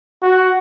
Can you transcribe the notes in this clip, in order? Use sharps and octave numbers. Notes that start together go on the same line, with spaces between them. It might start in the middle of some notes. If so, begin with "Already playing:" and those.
F#4